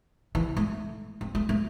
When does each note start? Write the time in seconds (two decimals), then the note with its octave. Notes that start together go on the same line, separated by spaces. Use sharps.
0.35 E3
0.57 A3
1.21 C4
1.35 A3
1.49 A3